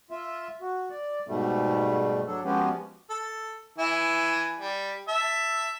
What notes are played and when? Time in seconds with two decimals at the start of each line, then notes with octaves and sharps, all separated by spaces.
0.11 F4 E5
0.61 F#4
0.90 D5
1.27 G#2 B2 G3 A3
2.27 F#3 D4 A4
2.44 F3 G#3 B3 C#4 F#4 G4
3.10 A4
3.78 E3 E4 G#5
4.59 G3
5.08 E5 A5